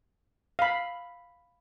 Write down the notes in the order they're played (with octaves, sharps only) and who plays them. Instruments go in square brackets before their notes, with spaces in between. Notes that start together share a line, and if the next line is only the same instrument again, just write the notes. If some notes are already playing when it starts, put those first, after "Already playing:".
[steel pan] F5 B5